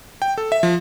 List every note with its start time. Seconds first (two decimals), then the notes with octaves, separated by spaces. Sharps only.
0.22 G5
0.38 A4
0.52 E5
0.63 F3